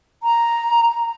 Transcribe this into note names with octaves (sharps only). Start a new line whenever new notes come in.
A#5